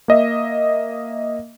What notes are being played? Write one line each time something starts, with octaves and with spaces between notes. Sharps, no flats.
A#3 D#5 E5